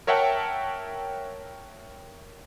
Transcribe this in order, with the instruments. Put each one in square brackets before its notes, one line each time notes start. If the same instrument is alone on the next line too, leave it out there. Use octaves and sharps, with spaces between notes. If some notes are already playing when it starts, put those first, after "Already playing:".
[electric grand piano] A#4 C#5 E5 F#5 G5 A5